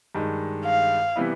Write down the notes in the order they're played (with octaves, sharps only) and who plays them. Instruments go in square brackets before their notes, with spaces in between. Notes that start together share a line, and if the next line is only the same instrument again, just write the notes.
[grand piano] G2 D#3 G#3
[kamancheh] F5
[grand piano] C3 E3 G3 B3 E4